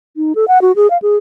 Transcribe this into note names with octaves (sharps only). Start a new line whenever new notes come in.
D#4
A4
F#5
F#4
G#4
F5
G#4